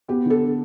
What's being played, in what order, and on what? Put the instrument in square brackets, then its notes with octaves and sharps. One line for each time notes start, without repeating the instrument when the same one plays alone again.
[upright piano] B3 [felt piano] G4
[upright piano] D3 [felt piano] A4